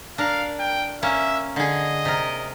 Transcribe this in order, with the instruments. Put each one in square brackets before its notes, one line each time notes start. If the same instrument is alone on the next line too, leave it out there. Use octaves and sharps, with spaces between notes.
[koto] D4 A#4 [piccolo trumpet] F5
[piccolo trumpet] G5
[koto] A#3 C#4 [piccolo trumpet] E5
[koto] D3 G#4 [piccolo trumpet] D#5
[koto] C3 A#4